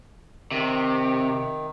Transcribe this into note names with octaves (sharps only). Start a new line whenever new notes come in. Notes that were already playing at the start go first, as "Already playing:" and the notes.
C3 D#3